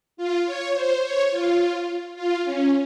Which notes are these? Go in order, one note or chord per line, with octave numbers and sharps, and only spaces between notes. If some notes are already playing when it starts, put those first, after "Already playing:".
F4
C#5
C5
C#5
F4
F4
C#4